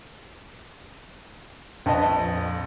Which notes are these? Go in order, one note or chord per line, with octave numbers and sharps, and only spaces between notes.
A#1 F2 B4 D#5 G5 A5